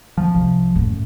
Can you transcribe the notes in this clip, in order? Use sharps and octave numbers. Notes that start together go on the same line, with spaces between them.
F3
C2
F#2 A2